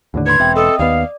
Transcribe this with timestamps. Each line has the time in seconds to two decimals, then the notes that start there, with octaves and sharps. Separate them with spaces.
0.14 D#2 A2 D3
0.27 B4 B5 C6 G#6
0.40 E1 C4 E5 G5
0.56 A4 D#5 D#6
0.79 D#2 B3 D5 F5